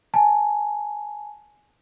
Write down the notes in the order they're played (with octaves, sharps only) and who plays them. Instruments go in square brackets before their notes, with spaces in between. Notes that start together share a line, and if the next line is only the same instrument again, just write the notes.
[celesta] G#5 A5